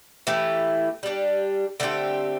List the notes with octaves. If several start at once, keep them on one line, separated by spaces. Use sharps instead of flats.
E3 A3 E4 G4
G3 D4 G4
D3 A3 C4 G4